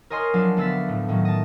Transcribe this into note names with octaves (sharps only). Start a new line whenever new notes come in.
A#4 C#5 D#5 G#5 C6 F6
F3 F#3 D4
D2 B3 F5 E6 A6 B6
A2
A2 D#3 F#3
D#5 A5